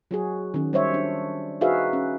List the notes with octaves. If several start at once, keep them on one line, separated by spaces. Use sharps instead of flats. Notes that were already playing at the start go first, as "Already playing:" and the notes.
F#3 F#4 G#4
D#3 C#4
G3 C5 C#5 E5
D4
D#4 F#4 G#4 B4 E5 F5
C#4